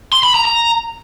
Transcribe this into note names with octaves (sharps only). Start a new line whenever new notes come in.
C6
B5
A#5
A#5